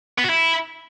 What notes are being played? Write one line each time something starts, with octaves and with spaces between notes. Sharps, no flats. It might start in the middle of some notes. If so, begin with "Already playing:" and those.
B3
F#4
E4